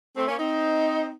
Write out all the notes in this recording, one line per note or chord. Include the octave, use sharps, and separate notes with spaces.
A3 C4
A#3 C#4
C4 D#4